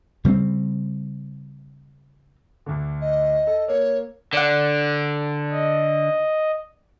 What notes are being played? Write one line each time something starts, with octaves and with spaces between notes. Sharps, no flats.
C#3 G3 B3 C4
D2 D3
D#5
A4
A#3 C#5
D3 D5 F#5
D#5